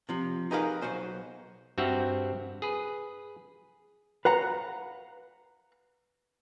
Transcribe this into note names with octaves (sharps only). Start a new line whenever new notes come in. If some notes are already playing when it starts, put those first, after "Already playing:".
C3 F3
D#4 G4 G#4 A#4 B4 F5
B1 F#4 C5 D#5
G2 C4 F#4 G4 E5 F#5
G#4 B4
B4 F5 F#5 A#5